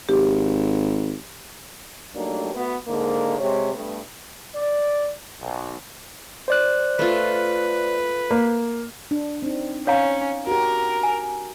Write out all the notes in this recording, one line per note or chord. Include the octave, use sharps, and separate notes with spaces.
G#1 G4
F#3 G3 A3 A#3 D4 D#4
A3 B3 F#4 B4
G#2 D3 A#3
C3 G#3 C#5
G2 A3 B3
D5
B1
C5 D5 F#6
A3 F4 B4
A#3
D4
C4 D#4
C#4 C#5 F5 A#5
F#4 G4 A#4
G#5